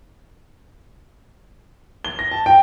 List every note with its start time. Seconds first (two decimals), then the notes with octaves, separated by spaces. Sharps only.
2.05 G7
2.19 A#6
2.31 A5
2.46 G5